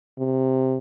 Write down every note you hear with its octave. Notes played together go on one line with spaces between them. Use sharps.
C3